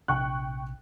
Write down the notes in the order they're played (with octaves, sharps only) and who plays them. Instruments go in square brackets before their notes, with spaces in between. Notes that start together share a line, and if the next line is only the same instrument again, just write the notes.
[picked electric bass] A#1 C3 D4 [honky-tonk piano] G5 C#6 F#6